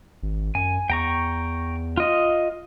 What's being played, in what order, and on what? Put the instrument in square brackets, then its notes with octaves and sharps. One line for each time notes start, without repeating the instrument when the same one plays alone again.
[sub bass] G#1
[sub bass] F#2 [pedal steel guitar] G#5
[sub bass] E2 [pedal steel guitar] G5 A#5 C#6
[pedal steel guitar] F4 D#5